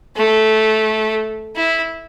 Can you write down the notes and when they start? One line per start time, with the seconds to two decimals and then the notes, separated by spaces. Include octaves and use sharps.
0.17 A3
1.56 E4